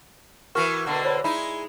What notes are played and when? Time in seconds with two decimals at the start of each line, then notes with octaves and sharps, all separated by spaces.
0.55 E3 B3 F#4 A#4 C#6 F6
0.86 B2 D3 A#3
1.05 C5 C#5 B5
1.24 G#3 D#4 E4 B5